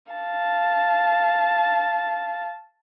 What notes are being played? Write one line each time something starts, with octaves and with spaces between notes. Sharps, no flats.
F5 A5